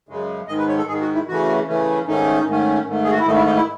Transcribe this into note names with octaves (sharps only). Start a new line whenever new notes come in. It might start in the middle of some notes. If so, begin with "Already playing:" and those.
F#2 C#3 G#3
G#2 D#3 G#3 D#5
B4
C#5
A4
G#2 D#3 G#3 G#4
F#4
E4
C#3 E3 A3 C#4 F#4
C#3 E3 A3 C#4
G#2 D#3 A3 C#4 D#4
G#2 D#3 A3 C#4
G#2 D#3 A3
G#4
F#4
E4
G#2 D#3 A3 D#4
E4
D#4
E4